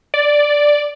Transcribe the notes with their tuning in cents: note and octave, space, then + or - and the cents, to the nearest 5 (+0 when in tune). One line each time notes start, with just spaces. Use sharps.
D5 +0